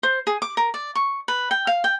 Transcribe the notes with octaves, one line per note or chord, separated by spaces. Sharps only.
C5
G#4
D6
A#4
D5
C#6
B4
G5
F5
G5